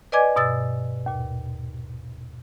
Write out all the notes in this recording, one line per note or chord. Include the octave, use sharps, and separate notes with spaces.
B4 D5 D#5 G#5 D6 G#6
G2 B2 E6 A6
D#2 A#2